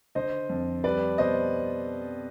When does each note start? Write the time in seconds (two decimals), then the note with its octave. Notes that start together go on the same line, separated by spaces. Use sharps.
0.15 D3 C5 D#5
0.49 F2
0.84 G3 B4 D5
1.18 B2 C5 D#5